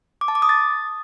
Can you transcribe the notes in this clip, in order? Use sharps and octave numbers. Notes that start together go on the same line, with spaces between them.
D6
A5
D6
D#6
A6